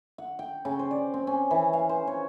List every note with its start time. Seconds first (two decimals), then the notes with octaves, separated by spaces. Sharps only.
0.18 F#5
0.39 G5
0.65 C#3
0.79 C5
0.91 D5
1.14 C4
1.27 C#4
1.51 E3
1.73 F5
1.89 C5
2.07 C#5